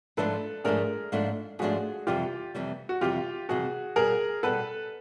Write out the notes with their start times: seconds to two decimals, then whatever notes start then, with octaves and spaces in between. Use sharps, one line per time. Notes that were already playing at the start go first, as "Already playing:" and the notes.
0.17 G#2 F3 A3 D4 A4 B4
0.64 G#2 F3 A3 D4 G#4 A#4
1.12 G#2 F3 A3 D4
1.59 G#2 F3 A3 D4 F#4 G#4
2.07 F2 C3 E3 G3 F4 G4
2.55 F2 C3 E3 G3
2.89 F#4
3.01 F2 C3 E3 G3 F4 G4
3.49 F2 C3 E3 G3 F#4 G#4
3.96 B2 G3 B3 G#4 A#4
4.43 B2 G3 B3 A4 B4